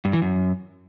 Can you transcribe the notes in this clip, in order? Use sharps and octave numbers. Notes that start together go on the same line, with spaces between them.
G2
E3
F#2